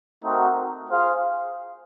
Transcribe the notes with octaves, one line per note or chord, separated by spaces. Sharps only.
A3 C4 D#4 F#4 A#4
F4 G#4 C5 F5